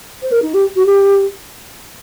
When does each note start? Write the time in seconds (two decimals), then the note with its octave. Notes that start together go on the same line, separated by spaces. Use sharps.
0.23 C5
0.32 A#4
0.42 D#4
0.54 G4
0.76 F#4
0.86 G4